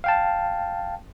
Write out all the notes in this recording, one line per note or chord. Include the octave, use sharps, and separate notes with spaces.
F5 G5 A5